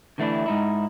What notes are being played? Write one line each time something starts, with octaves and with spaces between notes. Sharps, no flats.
D3 E3 A3 B3 D4 E4
G#2 D#4 E4